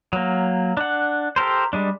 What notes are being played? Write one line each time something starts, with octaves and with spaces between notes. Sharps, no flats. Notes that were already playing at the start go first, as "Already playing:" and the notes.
F#3 A#3
D4 F#5
G4 A4 A#4 C5
G3 G#3 D4